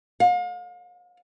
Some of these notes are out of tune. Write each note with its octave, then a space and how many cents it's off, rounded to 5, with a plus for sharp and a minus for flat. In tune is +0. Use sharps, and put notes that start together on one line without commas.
F5 +40